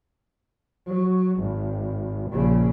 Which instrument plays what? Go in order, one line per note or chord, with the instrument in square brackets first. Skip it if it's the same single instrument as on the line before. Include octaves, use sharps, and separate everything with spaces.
[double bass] F#3
G#1
A#1 C#3